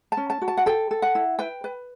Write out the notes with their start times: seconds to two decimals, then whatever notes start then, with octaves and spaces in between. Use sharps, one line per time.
0.12 A5
0.17 C#4
0.30 A5
0.42 F#4
0.48 A5
0.57 F#5
0.66 A4 G5
0.91 A4
1.02 F#5
1.15 E4
1.39 B4 G5
1.64 B4